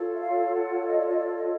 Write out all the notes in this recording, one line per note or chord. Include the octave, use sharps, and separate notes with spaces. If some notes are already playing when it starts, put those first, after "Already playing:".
Already playing: F4 A4 C#5
E5
F5
F#5
D#5
D5
D#5
D5
D#5